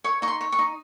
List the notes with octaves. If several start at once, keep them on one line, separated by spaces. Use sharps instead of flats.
C#5 C#6
D#4 C#6
C6
C#5
C#6
D#4